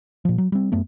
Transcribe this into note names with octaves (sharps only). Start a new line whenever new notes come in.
A#2 F3
F#3
G3 C4
F#2 A3 B3